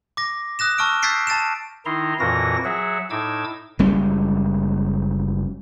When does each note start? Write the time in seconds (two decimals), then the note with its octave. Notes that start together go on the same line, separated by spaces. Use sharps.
0.17 D6 A#6
0.59 D#6 F#6 A#6 E7
0.78 A5 C#6 E6 F6 D7
1.02 E6 G6 A6 B6 C7 D7
1.27 A5 A6 D7 E7
1.86 D#3 D#4 E4 A#5 C6
2.20 F2 A#2 E3 F#4 A#4 A#6
2.65 F#3 G#4 E5 F#5
3.10 A2 D#4 D6 E6 G#6
3.79 F#1 G3 G#3 C#4